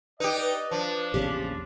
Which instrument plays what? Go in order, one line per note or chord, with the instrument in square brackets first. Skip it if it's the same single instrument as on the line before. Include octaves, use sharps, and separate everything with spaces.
[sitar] D#4 G4 [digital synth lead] B4 [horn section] D5 D#5
[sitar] F3 [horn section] D4
[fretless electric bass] A#1 E2 C#3 [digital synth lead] G4